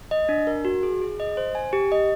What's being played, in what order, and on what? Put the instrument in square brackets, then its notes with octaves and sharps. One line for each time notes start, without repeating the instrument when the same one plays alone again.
[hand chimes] D#5
D4
A#4
F#4
G#4
G#4
D#5
C5
G#5
G4
D#5